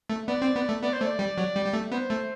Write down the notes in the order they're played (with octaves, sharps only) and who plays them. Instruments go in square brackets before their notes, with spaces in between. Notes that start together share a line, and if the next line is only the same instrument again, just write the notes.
[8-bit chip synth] A3
[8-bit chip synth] B3 [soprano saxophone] D5
[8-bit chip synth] C4
B3
A3
[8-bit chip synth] B3 [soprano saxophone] D5
[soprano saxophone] C5
[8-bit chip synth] A3
[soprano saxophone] D5
[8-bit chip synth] G3
F#3
G3
G3
A3
[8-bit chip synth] B3 [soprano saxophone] C5
[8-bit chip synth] A3